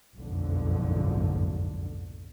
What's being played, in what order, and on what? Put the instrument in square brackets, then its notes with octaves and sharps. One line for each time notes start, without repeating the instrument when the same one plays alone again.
[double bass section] F#1 B1 F2 G#2 D3